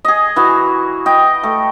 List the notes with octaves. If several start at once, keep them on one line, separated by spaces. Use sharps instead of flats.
G#4 D#5
E3 F#4
D#5 G5
A3